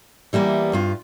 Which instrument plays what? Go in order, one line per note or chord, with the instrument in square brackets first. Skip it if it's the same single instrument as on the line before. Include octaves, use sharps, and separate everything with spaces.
[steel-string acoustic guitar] E3 G3 A#3 B3
G2 F4